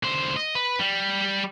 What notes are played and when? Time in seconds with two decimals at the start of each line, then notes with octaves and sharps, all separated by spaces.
0.03 D3 C5
0.37 D#5
0.55 B4
0.79 G3